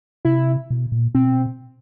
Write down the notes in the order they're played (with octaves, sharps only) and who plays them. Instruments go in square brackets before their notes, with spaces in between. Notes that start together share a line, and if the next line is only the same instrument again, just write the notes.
[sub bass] C3 [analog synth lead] E4
[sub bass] B2
A#2
[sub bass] B2 [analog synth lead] C4